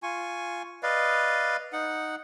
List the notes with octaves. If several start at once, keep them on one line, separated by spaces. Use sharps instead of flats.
F4 G#5 C#6
B4 D5 D#5 F5
D#4 F#5